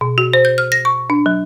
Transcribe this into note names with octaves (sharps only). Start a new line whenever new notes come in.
B2
F#4
C5
G6
F6
A#6
C#6
D4
F#3